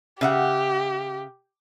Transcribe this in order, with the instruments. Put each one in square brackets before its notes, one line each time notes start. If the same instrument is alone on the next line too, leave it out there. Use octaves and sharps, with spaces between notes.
[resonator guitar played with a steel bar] C#3 E5 F#5 [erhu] G4